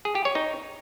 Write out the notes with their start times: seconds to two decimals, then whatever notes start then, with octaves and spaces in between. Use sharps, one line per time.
0.05 G#4
0.15 G4
0.25 C#5
0.35 D#4